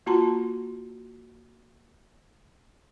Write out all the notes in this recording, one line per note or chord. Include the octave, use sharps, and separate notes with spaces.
A#3 F4 F#4 A5 A#5 C6